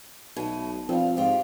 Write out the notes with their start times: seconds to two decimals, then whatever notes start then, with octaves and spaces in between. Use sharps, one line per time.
0.36 B1 B2 A3
0.89 G2 F3 C4 F5
1.17 G#2 F4 G4